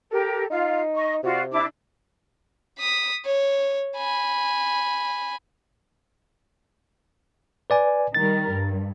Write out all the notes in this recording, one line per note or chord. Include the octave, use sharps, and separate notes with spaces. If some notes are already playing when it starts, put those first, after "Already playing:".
G4 A4 A#4
D#4 F4 F5
D#5 C#6
C3 F4 F#4 D5
D4 E4 D6
D#6 B6
C#5
G#5 B5
B4 D5 G#5
D#3 G3 A#4 A6
G2